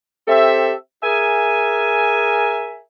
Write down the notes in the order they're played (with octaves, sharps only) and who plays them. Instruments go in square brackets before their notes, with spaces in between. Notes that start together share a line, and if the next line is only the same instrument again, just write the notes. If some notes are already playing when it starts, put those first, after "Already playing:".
[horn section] C4 G4 A4 E5
G#4 A#4 E5 G#5